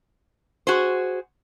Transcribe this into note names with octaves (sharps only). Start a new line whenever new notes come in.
F#4 G#4 C5